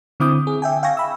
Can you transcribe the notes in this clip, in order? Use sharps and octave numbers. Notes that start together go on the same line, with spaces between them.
D3 C4 E4 D6 D#6 G6
G#4
E5 G5 G#5
F5 G5 G#5 C#6 A#6
B5 E6